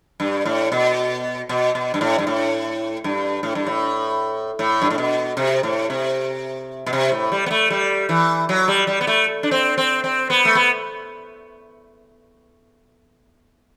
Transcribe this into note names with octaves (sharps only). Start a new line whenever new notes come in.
G2
A2
B2
B2
B2
G2
A2
G2
A2
G2
A2
G2
A2
A2
G2
A2
B2
C3
A2
C3
B2
C3
A2
G3
B3
A3
G3
E3
F#3
G3
G3
B3
A3
D4
C4
C4
C4
B3
A3
B3